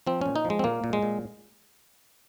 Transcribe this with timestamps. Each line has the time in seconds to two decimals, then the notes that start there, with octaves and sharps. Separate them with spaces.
0.07 F3 C4
0.21 A#2 C#4
0.36 D#4
0.45 F3
0.50 G#3
0.59 C4
0.64 A#2 A#3
0.84 A#2
0.93 G#3
1.02 A#2